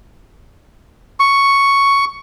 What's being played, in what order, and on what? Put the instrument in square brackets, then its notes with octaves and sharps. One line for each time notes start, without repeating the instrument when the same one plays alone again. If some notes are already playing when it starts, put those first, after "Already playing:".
[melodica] C#6